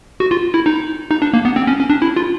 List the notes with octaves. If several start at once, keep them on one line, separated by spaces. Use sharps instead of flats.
F#4
F4
E4
D#4
D#4
D4
A#3
B3
C4
C#4
C#4
D4
E4
F4